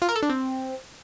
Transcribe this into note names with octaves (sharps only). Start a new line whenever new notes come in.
F4
A#4
A4
D4
C4